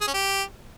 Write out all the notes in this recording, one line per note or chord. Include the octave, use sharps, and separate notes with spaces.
G#4
C#4
G4